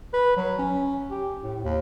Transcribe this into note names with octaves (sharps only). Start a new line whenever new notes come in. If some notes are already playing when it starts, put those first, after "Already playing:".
B4
F#3
C#4
G4
A2
D#2